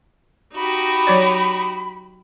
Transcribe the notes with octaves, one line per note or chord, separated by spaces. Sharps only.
D#4 F#4 G4 B5
F#3 C#5 D5